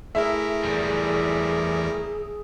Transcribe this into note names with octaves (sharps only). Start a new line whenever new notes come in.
A3 E4 G#4 A#4 E5
E2 G3